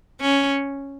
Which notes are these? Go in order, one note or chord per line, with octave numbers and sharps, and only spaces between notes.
C#4